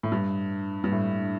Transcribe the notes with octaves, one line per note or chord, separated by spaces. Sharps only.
A2
G2
G2
A2